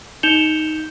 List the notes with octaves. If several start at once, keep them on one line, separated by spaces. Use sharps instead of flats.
D#4 G6 C#7 E7 F7 G7